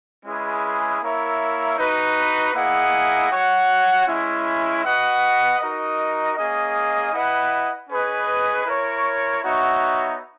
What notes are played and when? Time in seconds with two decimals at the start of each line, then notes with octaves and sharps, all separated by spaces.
0.24 G#3 C#4 E4 G#4 B4
1.01 A#3 E4 A#4 C#5 E5
1.77 D#4 F#4 B4
2.54 A#3 E4 G#4 D#5 F#5
3.30 F#4 C#5 F#5
4.07 G#3 C#4 E4
4.83 F#4 B4 D#5 F#5
5.60 D#4 F#4 A#4 D#5
6.37 A#3 C#4 G#4 D#5
7.13 E4 B4 D#5 F#5
7.89 C#4 G#4 B4 D#5
8.66 E4 A#4 C#5
9.43 B3 D#4 F#4 C#5 E5